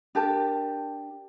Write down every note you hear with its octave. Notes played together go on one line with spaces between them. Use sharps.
D4 G4 A#4 A5